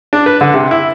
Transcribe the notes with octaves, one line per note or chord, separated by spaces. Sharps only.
D4
B4
D3
C3
E4